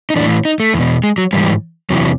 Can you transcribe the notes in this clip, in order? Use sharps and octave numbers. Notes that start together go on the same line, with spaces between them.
D#4
A2 E3 D4
D#4
A3
E2
B2
G#3
F#3
G#2 E3 G3
E2 C3 E3 F#3